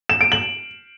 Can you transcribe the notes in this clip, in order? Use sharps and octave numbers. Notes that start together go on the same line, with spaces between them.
E7
D7
F#7